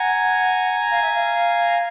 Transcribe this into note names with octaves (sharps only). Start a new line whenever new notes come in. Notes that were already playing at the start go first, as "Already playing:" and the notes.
Already playing: F#5 G#5 A#5
F5
E5
F5